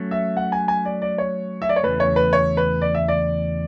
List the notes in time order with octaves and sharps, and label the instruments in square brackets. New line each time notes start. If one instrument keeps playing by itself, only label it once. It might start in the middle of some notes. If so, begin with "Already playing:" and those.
Already playing: [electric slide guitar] F#3 A3 C#4
[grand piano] E5
F#5
G#5
G#5
D5
D5
C#5
E5
D5
C#5
[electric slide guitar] E2 C#3 E3 A3 [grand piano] B4
[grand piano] C#5
B4
C#5
B4
D5
E5
D5